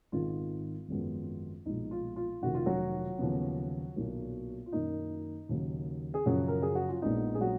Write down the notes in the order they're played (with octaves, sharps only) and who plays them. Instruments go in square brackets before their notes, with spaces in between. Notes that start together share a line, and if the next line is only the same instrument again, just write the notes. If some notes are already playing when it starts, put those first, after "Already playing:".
[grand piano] G#1 G#2 D#3 F4
G#1 F#2 F3 G#3 B3
B1 A#2 F3 G#3 D#4
F4
F4
F1 F2 D#3 F#4
F4
F#3 F#4
D#2 C#3 F3 B3
B1 A#2 F#3 A#3
F4
F#2 D#3 A#3 D#4
D#2 C#3 F#3 A#3
G#4
F#2 C#3 F3 F#3 F#4
A#4
G#4
F#4
F4
A#1 A#2 G#3 B3 D#4
G#4
F#3 F#4